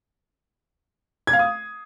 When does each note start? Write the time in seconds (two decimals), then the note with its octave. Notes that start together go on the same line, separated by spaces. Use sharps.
1.27 G#6
1.33 F5
1.39 D#6